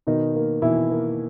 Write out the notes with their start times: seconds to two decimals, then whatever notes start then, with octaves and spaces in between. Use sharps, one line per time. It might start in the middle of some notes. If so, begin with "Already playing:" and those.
0.07 B2 D#3 D#4
0.35 A#3
0.62 B2 E3 E4
0.91 A#3